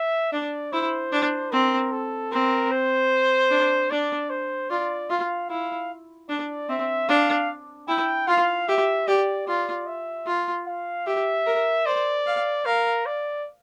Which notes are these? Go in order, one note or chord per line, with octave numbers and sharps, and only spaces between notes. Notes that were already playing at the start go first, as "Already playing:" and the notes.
Already playing: E5
D4 D5
E4 C5
D4
C4 A#4
A4
C4 A#4
C5
D4
D4 D5
C5
F4 D5
F4 F5
E4 F5
D4 D5
C4 E5
D4 F5
E4 G5
F4 F5
G4 E5
G4 D5
F4 D5
E5
F4
F5
G4 E5
A#4
C5 D5
F5
A#4 F5
D5